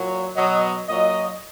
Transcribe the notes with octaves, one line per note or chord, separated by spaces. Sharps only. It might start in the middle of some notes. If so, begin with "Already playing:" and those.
Already playing: A#2 F#3
B2 F#3 D#5
A#2 F#3 D#5